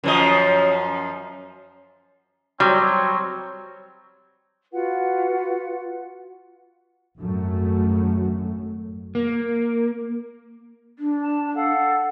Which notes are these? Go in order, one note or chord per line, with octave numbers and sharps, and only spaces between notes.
F#2 F3 D#5
F#3 G3 C4 C#5
F4 F#4 B4 F#5
G#1 F#2 F#3 A3
A#3
D4
A5
A4 F5 F#5